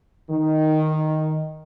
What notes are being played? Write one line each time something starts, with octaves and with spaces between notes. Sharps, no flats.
D#3